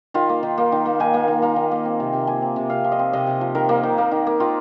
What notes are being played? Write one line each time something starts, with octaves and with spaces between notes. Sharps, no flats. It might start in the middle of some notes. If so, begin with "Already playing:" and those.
D#3 F4
A#3
D#3
A#3
D#3
A#3
D#3 G#5
A#3
D#3
A#3 A#5
D#3
A#3
C4
C3
C3
F3 G#5
C4
C3
C3 F5
F3
D#5
C4
C3 D#5
C3
F3
D#3 A#4
A#3
D#3
A#3
D#3
A#3
D#3 F4